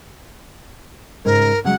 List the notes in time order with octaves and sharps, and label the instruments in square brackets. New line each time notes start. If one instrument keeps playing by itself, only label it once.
[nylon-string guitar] G#2 C#3 [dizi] A#4
[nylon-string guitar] C#3 F#3 G#3 [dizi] F#5